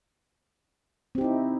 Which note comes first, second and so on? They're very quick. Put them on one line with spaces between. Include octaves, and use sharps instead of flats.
C4 G4 D#4 E4